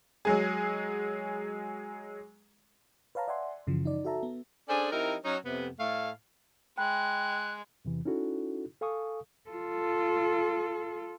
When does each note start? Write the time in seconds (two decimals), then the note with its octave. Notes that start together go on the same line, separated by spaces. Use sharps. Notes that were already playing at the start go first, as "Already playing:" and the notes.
0.25 F#3 G#3 G#4
3.15 B4 C#5 F5 A5 A#5
3.28 D5 E5 F#5 G#5 C6
3.67 F#2 C#3 E3 F3
3.85 D#4 D5
4.05 F#4 A4 E5 A5 A#5
4.23 B3
4.68 C#4 D4 G#4 A4 C5 D5
4.92 F3 C4 D#4 E4 G4 A#4
5.25 F#3 C#4 D#4
5.45 F2 C3 B3
5.79 A2 A3 F5
6.78 G#3 G5 B5 F#6
7.85 E2 C3 E3
8.05 C#4 D#4 E4 F#4 A4
8.81 A4 F5 G#5 C#6 D#6
9.50 F4 A4